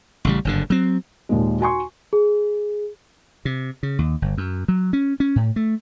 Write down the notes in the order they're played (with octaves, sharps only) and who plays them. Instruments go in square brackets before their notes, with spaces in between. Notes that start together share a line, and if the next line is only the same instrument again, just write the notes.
[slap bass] A1 C#3 G3
F#1 G2 D3
F#3 C4
[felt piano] D#2 A#2 G#3
F#4 G#5 C6 C#6
[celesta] G#4
[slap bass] C3
C#3
D#2
G1
F#2
F#3
C#4
C#4
A2
A3